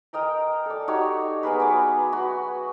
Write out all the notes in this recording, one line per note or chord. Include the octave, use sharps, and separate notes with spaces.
A#4 D#5 G5 A#5
A4 D5
D#4 F#4 G4 C#5
B3 G#4 A#4 B4
F#3 B4 D6
F#4